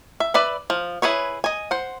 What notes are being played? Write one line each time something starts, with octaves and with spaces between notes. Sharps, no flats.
E5
B4 D5 E5 B5
F3
E4 G#4 B4 C#5
D#5 G#5
C5 F#5